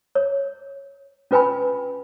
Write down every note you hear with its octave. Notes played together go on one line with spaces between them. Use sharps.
C#5
C#4 F4 B4 G5 G#5 B5